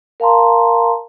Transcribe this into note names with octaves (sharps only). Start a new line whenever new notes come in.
A#4 F5 A5 A#5 C6